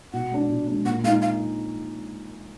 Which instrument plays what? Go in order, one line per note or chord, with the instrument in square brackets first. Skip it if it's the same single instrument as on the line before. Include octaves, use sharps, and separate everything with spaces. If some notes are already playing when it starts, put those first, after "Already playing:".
[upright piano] B2 [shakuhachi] F#5
[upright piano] G#3 D4
B2
G#3 D4
[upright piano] A#2 [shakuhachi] F#5
[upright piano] G#3 [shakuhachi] F5
[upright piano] D#4
[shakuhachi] F5